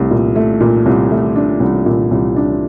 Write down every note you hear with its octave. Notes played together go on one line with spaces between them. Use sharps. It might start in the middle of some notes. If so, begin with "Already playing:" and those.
Already playing: C2 A3
A#2
A3
A#2
C2
A3
D4
C2
A#2
C2
D4